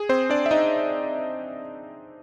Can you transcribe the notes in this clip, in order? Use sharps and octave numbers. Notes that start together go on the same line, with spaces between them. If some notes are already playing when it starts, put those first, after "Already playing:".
Already playing: G#4
C4 C5
D4 D5
E5
D#4 D#5